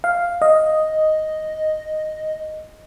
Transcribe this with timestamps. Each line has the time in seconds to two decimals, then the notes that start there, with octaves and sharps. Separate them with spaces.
0.04 F5
0.42 D#5